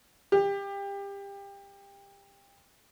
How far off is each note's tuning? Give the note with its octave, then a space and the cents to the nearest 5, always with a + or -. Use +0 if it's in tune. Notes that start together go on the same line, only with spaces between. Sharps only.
G4 +25